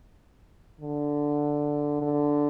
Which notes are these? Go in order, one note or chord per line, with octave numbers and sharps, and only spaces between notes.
D3
D3